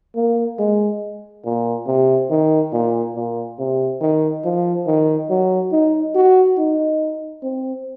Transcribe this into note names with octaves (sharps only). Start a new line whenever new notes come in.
A#3
G#3
A#2
C3
D#3
A#2
A#2
C3
D#3
F3
D#3
F#3
D#4
F#4
D#4
C4